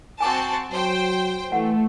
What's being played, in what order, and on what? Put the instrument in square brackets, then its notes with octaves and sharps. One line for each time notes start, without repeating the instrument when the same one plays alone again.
[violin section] C4 F#4 A5 [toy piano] G#5 D6
[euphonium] F#3 [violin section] C5 G5
[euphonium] E3 [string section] A3 [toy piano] F#5